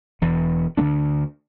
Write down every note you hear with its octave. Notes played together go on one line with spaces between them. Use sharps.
E1 E2 E3
D2 D3 A3 D4